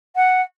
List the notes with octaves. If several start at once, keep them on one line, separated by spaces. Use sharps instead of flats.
F#5